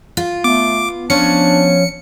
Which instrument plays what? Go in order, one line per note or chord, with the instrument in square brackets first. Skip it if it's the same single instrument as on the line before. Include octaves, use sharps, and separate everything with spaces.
[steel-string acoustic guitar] F4
[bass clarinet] A3 [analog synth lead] B3 [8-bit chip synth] D6
[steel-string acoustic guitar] F3 C#4 C#5 [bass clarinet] D4 [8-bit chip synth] C#7